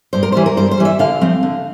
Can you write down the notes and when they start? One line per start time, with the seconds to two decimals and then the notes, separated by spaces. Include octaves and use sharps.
0.13 G2 C5
0.23 A#4
0.32 E3 G3 C5
0.46 A#4
0.57 G2 C5
0.71 C5
0.78 E3 G3
0.85 E5
0.99 D3 F5
1.21 F3 A3 C4
1.43 D3